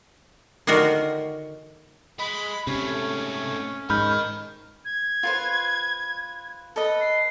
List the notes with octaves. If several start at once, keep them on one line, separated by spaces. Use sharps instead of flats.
D3 D#3 F4 F#4 A#4
G#3 B5
G#2 C3 A3 C#4
G#2 A#4 D#5 B5 F6 G6
G#6
F4 B4 C5
A4 B4 D#5
C7